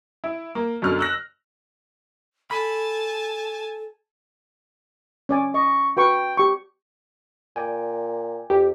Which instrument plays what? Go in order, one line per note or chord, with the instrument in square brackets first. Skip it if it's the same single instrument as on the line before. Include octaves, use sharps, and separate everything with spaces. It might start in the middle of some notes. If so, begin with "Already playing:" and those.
[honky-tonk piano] E4
A#3
F#2 B2 D3 F6
E6 F#6 A#6
[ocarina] A4 [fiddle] G#5 A5 [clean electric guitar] B5
[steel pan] C#4 D5 G#5
[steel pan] D#5 [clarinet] C#6
[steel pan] F#4 B4 C#6 [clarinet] G5
[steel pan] G4 C#6
[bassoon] A#2 [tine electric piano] D5 G5 G#5
[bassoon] F2 [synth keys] G4